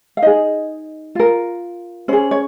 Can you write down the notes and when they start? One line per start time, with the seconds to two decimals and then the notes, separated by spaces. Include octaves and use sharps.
0.17 F5
0.22 D#4 G#4 D#5
1.15 F4 A#4
2.08 C#4 G#4 C5
2.31 C#5